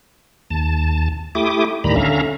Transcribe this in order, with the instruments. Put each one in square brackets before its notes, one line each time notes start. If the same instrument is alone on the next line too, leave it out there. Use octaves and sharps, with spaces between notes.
[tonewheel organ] D#2 A5
A3 E4 G4 D6 D#6
D2 A2 D#3 G3 A#5 B5
D3 C#4 E5 F5 A#5